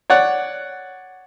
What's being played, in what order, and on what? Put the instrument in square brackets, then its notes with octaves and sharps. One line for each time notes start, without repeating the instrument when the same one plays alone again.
[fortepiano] C#5 D5 F#5